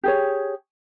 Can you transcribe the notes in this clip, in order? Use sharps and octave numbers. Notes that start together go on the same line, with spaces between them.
G4 G#4 C#5